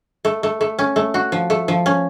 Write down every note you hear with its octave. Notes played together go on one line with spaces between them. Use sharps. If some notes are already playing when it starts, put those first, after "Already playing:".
A3
A3
A3
C#4
A3
F#4
F3
A3
F3
C#4